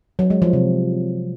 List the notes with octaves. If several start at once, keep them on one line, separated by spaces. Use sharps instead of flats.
F#3
G#3
F3
C3